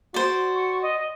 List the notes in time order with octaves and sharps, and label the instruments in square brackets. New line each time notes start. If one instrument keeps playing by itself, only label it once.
[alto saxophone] F#4 [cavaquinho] C5 D5
[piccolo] C#6
D#5